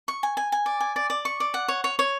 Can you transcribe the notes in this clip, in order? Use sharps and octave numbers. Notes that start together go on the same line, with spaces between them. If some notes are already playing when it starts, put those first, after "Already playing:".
C#6
G#5
G#5
G#5
D5
G#5
D5
D5
C#6
D5
F#5
C#5
C#5
C#5